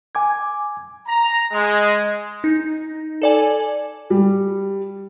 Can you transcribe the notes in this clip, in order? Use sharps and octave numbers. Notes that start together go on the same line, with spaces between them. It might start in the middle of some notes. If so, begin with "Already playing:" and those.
G#5 D6 G#6
A#5
G#3
D#4
A4 D5 G#5
G3